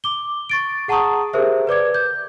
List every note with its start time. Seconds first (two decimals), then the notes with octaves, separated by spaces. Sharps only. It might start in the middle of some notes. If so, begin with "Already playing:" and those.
0.04 D6 G7
0.50 C#6 A6 D7
0.88 G#4 F#5 A5 A#5 C#6 D#6
1.33 G4 G#4 A#4 C5 E5
1.67 B4 D5 D6 G#6
1.94 G6